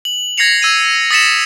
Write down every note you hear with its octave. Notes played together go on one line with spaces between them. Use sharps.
F#7
G#6 A#6 C7 C#7 F7
E6 G#6 D#7
D#6 A6 B6 C#7 E7